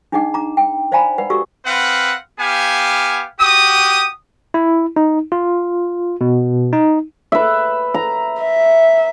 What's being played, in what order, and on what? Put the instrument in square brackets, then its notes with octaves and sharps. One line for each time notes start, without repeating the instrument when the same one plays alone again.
[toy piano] D4 D#4 G#4 D#5 F#5 D6
A#5 D6
G5
C5 D5 F5 G#5 A#5 B5
B4 D5 F#5
F#4 G4 A4 D5 C#6 E6
[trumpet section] C4 B4 F5 F#5
B3 G4 F5 G#5
F#4 G4 D#6
[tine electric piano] E4
D#4
F4
B2
D#4
[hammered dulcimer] B4 E5
A#5
[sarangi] E5